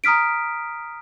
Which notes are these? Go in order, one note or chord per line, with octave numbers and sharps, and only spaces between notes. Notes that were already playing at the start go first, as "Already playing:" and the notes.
A#5 D#6 F6 B6 D7